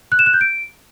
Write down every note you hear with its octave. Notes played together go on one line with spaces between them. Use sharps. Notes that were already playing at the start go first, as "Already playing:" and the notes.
F#6
E7
F#6
G6
D7